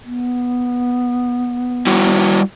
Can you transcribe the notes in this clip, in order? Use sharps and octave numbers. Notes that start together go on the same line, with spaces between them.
B3
G3 E4 F#4